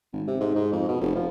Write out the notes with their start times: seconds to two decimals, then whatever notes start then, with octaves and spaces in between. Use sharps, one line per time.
0.13 G#1
0.27 C3
0.40 G#2
0.55 G#2
0.72 F2
0.88 B2
1.01 F1
1.15 F3